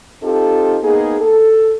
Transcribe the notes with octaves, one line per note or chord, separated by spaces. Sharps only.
C4 D#4 F4 G4 A4
A#3 B3 D#4 G#4
A4